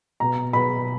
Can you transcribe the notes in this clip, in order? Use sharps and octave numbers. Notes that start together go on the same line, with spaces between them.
B2 A#5
B2 B5